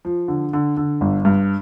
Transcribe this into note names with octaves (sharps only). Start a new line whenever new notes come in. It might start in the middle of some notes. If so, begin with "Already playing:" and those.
F3
D3
D3
D3
G1
G2